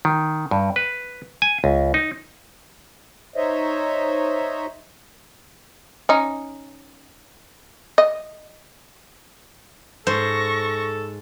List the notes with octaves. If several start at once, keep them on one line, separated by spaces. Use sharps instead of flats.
D#3
G2
B4
G#5
C#2
D#4
D#4 C5 C#5 D#5 E5
C#4 D#4
D#5
G#2 A4 C5 C#6 A#6